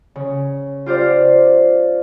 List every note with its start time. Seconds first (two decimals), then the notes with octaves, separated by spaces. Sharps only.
0.16 C#3
0.86 F4 G4 C5 D5 F5